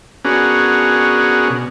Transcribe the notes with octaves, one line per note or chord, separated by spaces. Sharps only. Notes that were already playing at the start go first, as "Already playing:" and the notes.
B3 C#4 D4 F#4 G#4 A#4
B2